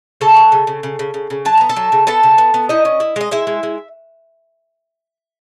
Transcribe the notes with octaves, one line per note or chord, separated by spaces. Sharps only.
C#3 A4 A5
F#3
C#3
C#3
C#3
C#3
C#3
C#3
F#3 A5
B3 A#5
A4 A5
F#3
C#3
B3 A4 A5
C#3
B3
B3
D#4 E4 D#5
C#4
E4
G#3 D#5
G#3 E4 E5
G#3
G#3